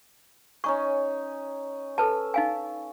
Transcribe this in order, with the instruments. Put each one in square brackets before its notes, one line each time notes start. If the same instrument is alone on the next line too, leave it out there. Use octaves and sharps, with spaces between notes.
[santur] C#4 D#4 G#5 [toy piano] C#6
[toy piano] A4 B4 A5 [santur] E6
[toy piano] D#4 F5 G#5